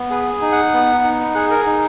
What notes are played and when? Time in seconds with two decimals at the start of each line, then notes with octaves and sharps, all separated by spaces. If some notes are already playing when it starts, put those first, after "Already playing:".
Already playing: B3
0.10 G#4 B4
0.41 D#4
0.52 F#5
0.73 B3
1.04 D#4
1.35 G#4 F#5
1.50 A#4
1.67 D#4